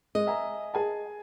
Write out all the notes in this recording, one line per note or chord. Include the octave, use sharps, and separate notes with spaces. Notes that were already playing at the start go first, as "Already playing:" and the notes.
G#3 D#5
E5 G#5 A#5
G#4 G#5 A5